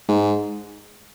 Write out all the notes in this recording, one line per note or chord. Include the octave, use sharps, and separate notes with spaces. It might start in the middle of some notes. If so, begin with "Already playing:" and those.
G#2